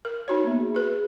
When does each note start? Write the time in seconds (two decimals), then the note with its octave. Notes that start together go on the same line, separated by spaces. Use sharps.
0.05 A#4
0.28 D#4 F#4 C#5
0.44 A#3 B3 E5
0.60 G#4
0.75 F#4 B4